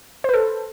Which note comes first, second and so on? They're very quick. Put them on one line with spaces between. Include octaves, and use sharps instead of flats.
C5 B4 A4